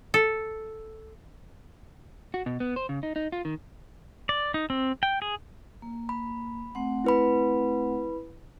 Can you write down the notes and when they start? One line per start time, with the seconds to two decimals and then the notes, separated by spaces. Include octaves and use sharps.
0.14 A4
2.34 F#4
2.46 B2
2.60 B3
2.76 C5
2.89 C#3
3.03 D#4
3.16 D#4
3.32 F4
3.45 D#3
4.29 D5
4.54 D#4
4.70 C4
5.03 G5
5.22 G#4
5.82 A#3
6.09 B5
6.75 A3 C4 F#5
7.04 E4 B4 B5